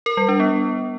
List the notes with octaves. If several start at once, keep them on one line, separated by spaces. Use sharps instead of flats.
A#4
G3
D4
B3